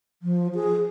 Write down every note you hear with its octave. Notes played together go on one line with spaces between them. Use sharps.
F3
G#4